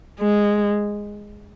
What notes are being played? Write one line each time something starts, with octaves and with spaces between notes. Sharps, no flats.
G#3